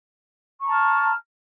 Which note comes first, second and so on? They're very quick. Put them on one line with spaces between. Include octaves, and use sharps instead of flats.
C#6 A#5 A5 F6